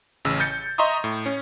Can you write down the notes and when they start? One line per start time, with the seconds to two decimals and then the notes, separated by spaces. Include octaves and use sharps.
0.25 A1 C#3 E6
0.40 G6 A6 C#7
0.78 D#5 E5 A#5 C6 C#6 D#6
1.04 A2
1.26 C#4